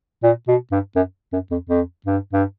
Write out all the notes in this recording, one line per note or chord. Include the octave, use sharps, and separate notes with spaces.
A#2
B2
G2
F#2
F#2
F2
F2
G2
G2